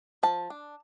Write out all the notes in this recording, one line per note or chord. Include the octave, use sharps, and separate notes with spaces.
F3 A5
D4